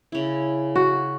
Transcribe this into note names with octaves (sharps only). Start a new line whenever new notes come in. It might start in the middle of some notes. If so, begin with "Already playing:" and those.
C#3 E4
F#4